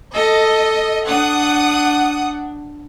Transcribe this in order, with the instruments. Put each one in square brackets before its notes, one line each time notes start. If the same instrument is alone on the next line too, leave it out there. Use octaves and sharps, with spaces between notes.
[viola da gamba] A4 [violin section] D#5
[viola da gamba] D4 [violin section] F#5 D#6